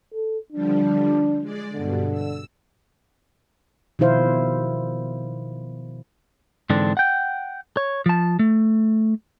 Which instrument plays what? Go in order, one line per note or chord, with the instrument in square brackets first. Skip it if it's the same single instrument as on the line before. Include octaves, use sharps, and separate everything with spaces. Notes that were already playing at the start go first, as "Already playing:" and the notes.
[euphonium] A4
[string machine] D3 F3 G3 [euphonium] D4
[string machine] G#3 D5
[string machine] G2 B2 [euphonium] D3
[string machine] E6
[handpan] B2 D#3 F3 E4 C5 F5
[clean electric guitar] G#2 D3 E3 C4 D4
F#5 G5
C#5
F3 A5
A3